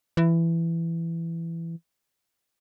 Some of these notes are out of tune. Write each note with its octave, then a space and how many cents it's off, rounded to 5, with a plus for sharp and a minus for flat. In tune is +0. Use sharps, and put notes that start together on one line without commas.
E3 +15